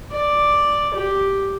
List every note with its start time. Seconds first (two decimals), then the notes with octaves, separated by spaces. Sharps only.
0.12 D5
0.94 G4